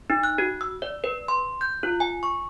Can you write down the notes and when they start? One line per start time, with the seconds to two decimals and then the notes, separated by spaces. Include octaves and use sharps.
0.10 D#4
0.23 F#6
0.38 F#4
0.61 E6
0.82 D5
1.04 B4
1.28 C6
1.61 G6
1.83 F4
2.00 G#5
2.23 C#6